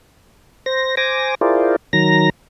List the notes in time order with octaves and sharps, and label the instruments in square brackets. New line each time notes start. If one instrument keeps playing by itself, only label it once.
[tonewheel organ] C5 A#6
C5 G#5 D6 A#6
E4 F4 G#4 A#4 C5 D5
D#3 F#3 A#5 A#6